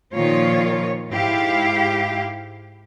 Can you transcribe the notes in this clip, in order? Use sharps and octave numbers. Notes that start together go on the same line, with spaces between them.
A#2 D#3 F3 F4 C#5
G#2 E4 G4 F5